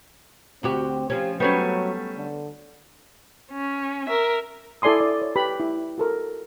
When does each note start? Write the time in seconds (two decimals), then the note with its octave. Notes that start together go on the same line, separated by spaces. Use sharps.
0.63 D2 C4 F#4 G4
1.10 F3 C#4 G4
1.40 F#3 G3 A3 B3 C#4
2.16 D3
3.52 C#4
4.07 A#4 E5
4.82 E4 A4 D5 G#5 C6 D#6
5.01 D5
5.22 C#5
5.36 G4 B4 B5
5.60 E4
5.98 F#4 A4 A#4